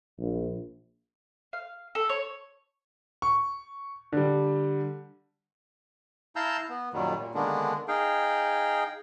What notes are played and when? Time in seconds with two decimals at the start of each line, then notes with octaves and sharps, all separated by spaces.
0.20 A#1
1.53 F5
1.95 A4
2.09 C#5
3.22 C#6
4.12 D3 G3
6.36 E4 F5 A5 A#5 E6 G6
6.69 B3
6.93 F#2 A#2 D#3 F#3 G3
7.19 A#2
7.34 D3 D#3 G#3 A#3 B3 D4
7.88 D#4 G#4 F5 G5